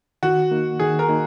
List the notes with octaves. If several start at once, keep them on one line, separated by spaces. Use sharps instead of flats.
D#3 F#4
A#3 D#4
D#3 G#4
A#4
A#3 D#4